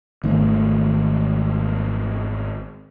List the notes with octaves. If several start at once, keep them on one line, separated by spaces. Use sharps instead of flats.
G#1 D#3 A3